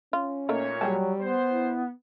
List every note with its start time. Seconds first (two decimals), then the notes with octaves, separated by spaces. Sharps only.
0.13 C#4 F4
0.49 A#2 A3 A#3 D#4 C#5
0.81 F#3 G3 G#4 G5 A5
1.20 B3 C5
1.52 E4